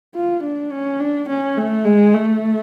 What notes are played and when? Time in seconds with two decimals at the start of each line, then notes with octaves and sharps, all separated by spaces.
0.15 F4
0.43 D4
0.71 C#4
1.00 D4
1.29 C#4
1.57 A3
1.85 G#3
2.14 A3